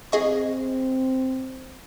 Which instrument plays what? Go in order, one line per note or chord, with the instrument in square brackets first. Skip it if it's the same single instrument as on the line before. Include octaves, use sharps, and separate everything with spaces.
[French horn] C4 [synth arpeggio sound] G#4 D#5 C#6